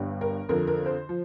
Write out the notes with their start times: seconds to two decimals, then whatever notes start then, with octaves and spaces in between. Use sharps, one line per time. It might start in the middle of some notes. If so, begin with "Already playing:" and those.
Already playing: G1 G2 G3
0.21 A#4
0.49 F2 D3 F3 A#4
0.67 A#4
0.86 C5
1.09 F3